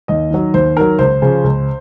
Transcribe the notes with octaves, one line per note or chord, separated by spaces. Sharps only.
D#2 D#5
D#3 F#3
D#2 C5
D#3 F#3 A#4
C#2 C5
C#3 F3
C#2